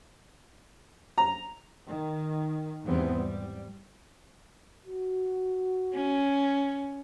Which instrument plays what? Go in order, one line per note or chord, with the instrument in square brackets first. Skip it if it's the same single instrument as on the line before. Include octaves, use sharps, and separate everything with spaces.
[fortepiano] A#5
[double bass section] D#3
E2 G#2 E3 G3 B3 C4
G3
[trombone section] F#4
[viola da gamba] C#4